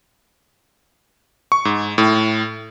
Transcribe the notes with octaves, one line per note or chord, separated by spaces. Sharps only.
C#6
G#2
A2